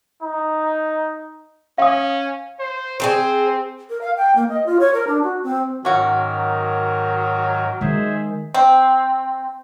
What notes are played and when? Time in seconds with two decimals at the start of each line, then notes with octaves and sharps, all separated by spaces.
0.22 D#4
1.78 C#4 F5 D#6
2.59 C5
3.00 C4 G#4 A4 C5
3.89 A#4
4.01 F5
4.17 G5
4.36 A#3
4.49 D#5
4.66 F4
4.80 C#5
4.94 A#4
5.07 D4
5.23 F#4
5.43 C4
5.85 G#2 D#3 F#3 C#4 F#4 A#4
7.81 D#3 G#3 G#4 C5 E5
8.54 C4